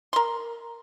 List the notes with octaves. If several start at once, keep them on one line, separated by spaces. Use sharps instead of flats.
A#4 C6